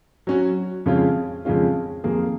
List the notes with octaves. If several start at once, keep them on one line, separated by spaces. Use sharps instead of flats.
F#3 C#4 F#4
F2 C#3 G#3 C#4 F4
F2 C#3 G#3 C#4 F4
F2 D#3 A#3 F4 G#4